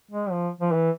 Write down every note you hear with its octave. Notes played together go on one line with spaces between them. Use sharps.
G#3
F3
F3
E3